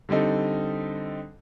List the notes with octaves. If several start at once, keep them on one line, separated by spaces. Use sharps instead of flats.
D3 G3 C4 D#4 A4